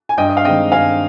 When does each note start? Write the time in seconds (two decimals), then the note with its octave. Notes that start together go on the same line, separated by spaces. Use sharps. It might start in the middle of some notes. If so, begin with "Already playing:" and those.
0.09 G#5
0.17 G2 D#5 G5
0.29 D#5
0.37 F5
0.44 D#3 G#3 C4 D#5 G5
0.72 G2 F5 G#5